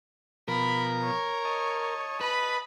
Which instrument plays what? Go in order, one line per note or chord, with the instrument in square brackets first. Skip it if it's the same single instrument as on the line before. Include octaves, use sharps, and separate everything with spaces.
[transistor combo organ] B2 F3 [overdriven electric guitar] A#4 [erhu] B5
[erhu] C#5
[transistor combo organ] D#5 A5
[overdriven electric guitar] B4 [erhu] B5